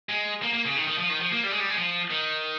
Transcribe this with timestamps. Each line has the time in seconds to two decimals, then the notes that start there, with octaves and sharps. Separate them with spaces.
0.09 G#3
0.42 A#3
0.53 A#3
0.65 C#3
0.76 D#3
0.87 D#3
0.98 F3
1.10 D#3
1.21 F3
1.32 A#3
1.43 G3
1.52 G#3
1.60 G3
1.69 G#3
1.77 F3
2.10 D#3